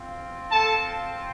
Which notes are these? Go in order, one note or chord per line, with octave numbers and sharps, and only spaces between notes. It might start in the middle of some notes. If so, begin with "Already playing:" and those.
Already playing: C4 F4
A4 A5